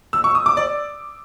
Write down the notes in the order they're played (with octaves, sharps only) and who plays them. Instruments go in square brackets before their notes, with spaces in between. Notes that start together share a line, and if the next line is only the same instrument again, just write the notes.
[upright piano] E6
C#6
D#6
D6
D5